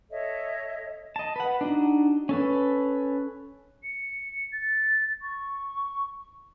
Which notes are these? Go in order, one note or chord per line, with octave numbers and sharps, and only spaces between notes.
A4 C#5 D#5 E5
D#5 A5
B4 F#5
D4 D#4 F#4
C#4 A4 B4
C#7
A6
C#6